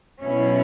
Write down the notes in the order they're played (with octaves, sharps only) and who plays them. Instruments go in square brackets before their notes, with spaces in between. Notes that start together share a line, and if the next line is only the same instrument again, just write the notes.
[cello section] B2 F#3 C#4 E4